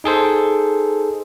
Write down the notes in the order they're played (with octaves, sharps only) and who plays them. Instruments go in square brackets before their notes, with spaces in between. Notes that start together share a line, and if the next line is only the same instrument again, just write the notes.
[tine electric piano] D#4 G#4 A4 C5